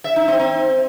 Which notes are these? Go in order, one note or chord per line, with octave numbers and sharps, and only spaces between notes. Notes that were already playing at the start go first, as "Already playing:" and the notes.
E5
D#4
C4
C4